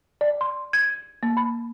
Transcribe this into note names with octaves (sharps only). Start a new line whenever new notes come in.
D5
C6
G#6
A#3
B5